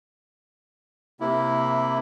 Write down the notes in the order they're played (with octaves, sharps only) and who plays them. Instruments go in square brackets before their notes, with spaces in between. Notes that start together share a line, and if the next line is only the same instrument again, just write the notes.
[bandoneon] C3 A#3 E4